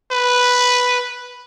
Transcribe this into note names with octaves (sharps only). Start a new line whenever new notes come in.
B4